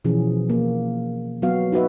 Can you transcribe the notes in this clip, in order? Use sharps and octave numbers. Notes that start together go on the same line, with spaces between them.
B2 E3 F3 C#4 G#4
A#3
F#3 B3 F#4 F5
D#4 F#4 B4 E5